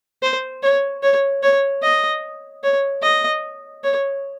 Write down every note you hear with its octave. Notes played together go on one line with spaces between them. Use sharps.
C5
C#5
C#5
C#5
D#5
C#5
D#5
C#5